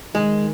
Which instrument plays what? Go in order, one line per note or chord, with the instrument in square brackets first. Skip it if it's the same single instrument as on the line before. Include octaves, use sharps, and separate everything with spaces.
[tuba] D#3 [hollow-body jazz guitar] G#3